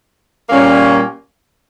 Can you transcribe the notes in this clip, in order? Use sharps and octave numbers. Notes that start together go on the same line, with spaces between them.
A#2 G3 A#3 C#4